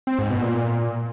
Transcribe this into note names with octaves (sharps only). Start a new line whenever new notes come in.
C4
G#2
B2
A#2